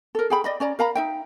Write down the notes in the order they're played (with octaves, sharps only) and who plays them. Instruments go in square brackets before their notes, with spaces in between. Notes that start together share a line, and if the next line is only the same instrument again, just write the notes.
[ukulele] A4 A#4
G#4 G5 B5
D5 D#5 B5
C#4 D5 A#5
A#4 F5 A#5 B5
D#4 E5 G5